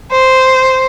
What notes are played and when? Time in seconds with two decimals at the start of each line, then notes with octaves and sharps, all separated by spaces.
0.11 C5